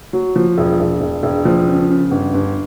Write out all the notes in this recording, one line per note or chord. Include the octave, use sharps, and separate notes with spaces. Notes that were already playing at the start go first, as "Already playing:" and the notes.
F#3
F3
E1
E1
E1
E1
F3
C#3
C#3
G1
G1